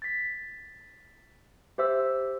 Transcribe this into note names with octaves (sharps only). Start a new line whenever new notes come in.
A6 B6
G4 C5 E5 E6